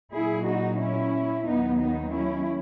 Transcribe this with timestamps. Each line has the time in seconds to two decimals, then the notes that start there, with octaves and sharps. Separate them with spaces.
0.13 A#2 F#3 E4 G#4
0.47 D#4 F#4
0.80 C#4 E4
1.47 D#2 D#3 F#3 B3 D#4
1.80 B3 D#4
2.14 C#4 E4